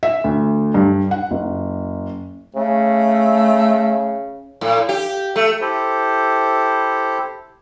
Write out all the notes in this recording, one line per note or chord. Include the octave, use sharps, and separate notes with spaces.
E5
D2
G2
F#5
F#1
C#3 A3
A2
G4
A3
E4 G4 A4 C5